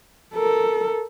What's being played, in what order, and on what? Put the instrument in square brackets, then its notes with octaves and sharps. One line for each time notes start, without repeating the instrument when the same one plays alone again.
[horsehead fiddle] A4 A#4